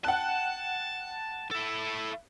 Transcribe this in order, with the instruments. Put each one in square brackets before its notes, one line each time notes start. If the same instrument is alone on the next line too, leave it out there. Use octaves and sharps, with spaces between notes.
[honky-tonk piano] F#5 G5 F#6 [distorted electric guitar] A5
[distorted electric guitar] E4 A4